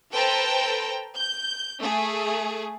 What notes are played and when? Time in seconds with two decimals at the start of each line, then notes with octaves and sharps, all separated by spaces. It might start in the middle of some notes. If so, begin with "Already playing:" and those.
0.12 A4 B4 C5 G5 A5 A#5
1.17 G6
1.78 A3 G#4